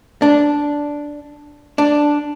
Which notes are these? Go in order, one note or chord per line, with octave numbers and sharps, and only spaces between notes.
D4
D4